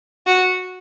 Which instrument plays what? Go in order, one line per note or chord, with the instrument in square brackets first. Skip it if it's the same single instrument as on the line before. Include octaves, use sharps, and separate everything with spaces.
[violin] F#4